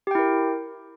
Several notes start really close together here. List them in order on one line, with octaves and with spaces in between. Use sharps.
G4 G5 E4 A#4